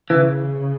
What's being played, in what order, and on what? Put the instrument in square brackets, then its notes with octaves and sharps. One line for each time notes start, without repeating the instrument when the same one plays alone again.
[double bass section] C#3 [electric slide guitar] E3